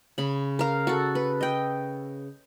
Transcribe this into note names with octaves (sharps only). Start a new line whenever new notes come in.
C#3 B5
A#4 F5
F#4 A4
B4
D#5 G5